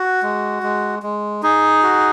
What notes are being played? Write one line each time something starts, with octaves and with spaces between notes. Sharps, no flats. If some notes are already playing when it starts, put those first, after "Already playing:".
Already playing: F#4
G#3
G#3
G#3
D#4 G#4
F#4